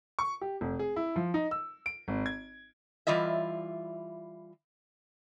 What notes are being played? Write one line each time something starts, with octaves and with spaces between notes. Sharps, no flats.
C#6
G4
F1
G#4
E4
F3
D#4
E6
D7
G#1
G#6
E3 G3 F4 D#5 E5